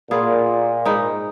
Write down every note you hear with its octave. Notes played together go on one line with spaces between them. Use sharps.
A#2 B3 F4 G#4
G#2 D#4 B4